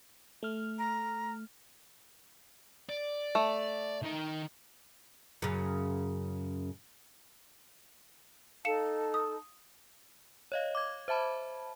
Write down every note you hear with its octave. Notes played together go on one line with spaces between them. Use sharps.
A3 F6
A#5
D5
A3
D#3 D#4
F#2 C#3
D#4 A4 F5 A5 C#7 E7
D#6
C#5 D#5 F5
D6 G#6
C5 E5 A5 B5